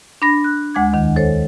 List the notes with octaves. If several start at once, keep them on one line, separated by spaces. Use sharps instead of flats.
D4 B5 A#6
F#6
D2 G#3 F#5 D6 G#6
E2 D#3
A4 C5 C#5